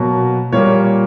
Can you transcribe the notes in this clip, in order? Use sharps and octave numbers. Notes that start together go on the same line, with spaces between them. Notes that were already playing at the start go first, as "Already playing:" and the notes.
Already playing: B2 F#3 A#3
A#2 G3 A#3 C#5